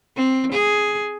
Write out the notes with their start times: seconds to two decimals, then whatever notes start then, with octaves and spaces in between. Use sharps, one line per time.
0.17 C4
0.53 G#4